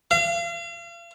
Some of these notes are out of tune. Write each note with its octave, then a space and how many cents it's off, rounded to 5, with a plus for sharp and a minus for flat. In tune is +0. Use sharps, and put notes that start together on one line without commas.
F5 -40